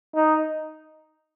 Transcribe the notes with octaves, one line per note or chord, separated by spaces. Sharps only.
D#4